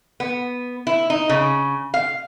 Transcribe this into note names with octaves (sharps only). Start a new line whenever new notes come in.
B3
E4
D#4
C#3
F5